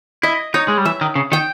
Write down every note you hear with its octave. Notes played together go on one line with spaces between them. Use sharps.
E4 D#5
D#4 C#5
G#3
G3
E3 E5
D#3
C#3
D#3 G5